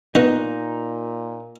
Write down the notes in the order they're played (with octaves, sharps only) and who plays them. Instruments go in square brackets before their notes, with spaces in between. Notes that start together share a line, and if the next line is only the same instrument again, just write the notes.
[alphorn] A#2 [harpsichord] B3 F#4 [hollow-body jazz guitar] D#4